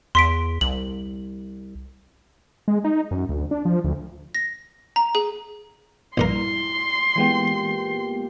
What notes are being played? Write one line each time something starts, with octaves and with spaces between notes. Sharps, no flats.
E2 C6 B6 D7
C2 F#7
G#3
D#4
F#2
D2
D4
F3
D2
A#6
A#5
G#4
A#1 G2 E4 A#4 C6
A#2 E3 G#3 B3 G4 G5